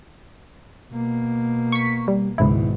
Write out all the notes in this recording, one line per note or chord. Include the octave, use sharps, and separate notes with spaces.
B2 A#3
C#6 B6
G3
G#1 C#2 G#2 B2 E4